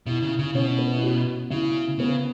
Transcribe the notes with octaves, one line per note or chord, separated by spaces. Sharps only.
B2 E4
C#3 E4
C#3 E4
B2 C#4
B3
E4
F#4
C#3 E4
C#3 B3